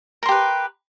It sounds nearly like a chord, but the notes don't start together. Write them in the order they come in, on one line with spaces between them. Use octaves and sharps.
A#4 C6 G4 B4